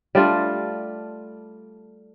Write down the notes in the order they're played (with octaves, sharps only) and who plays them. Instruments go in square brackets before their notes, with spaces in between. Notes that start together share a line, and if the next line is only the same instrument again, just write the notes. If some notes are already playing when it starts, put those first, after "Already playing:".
[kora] G3 A3 D4 F4